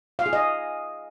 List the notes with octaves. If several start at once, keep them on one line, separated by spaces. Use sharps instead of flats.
F5
G#4
D#5